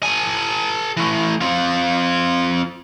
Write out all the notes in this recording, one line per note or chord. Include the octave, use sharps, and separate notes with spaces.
A4 G#5
E3 A3
C4 F4